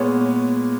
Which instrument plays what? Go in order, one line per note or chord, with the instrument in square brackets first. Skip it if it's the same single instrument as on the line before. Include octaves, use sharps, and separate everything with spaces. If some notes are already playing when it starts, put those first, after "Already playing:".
Already playing: [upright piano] A#2 G#3 B3 [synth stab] C#5